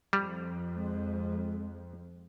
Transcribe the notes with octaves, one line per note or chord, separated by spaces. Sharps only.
F2 G3
G#3